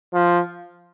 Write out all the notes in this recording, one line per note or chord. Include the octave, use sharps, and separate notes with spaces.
F3